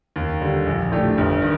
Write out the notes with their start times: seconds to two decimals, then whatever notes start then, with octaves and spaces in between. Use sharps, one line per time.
0.16 D#2
0.41 D3 G3 D4
0.67 A#1
0.92 A2 A3 D4 G4
1.18 G1
1.42 D#3